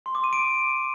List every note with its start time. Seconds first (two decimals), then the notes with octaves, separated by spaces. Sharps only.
0.06 C6
0.15 D6
0.24 D#7
0.33 D7